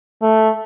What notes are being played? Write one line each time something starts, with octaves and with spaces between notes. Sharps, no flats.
A3